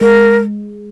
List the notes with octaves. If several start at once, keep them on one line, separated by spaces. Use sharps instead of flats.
G#3 A#4